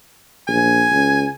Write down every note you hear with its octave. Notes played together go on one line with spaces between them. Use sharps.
A#1 G#5
C#2